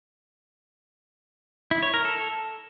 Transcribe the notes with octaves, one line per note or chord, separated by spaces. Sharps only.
E4
C#5
A#4
A4